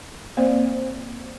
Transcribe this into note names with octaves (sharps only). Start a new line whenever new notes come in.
A#3 C4 C5 D5